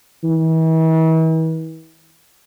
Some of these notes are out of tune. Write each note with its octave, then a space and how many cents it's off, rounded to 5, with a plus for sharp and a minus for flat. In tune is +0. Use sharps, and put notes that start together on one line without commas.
E3 -40